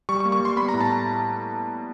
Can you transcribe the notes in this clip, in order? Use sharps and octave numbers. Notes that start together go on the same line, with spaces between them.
G3 C#6
C#6
A#3
C#6
G3 C6
B3 B5
A#5
A2
A5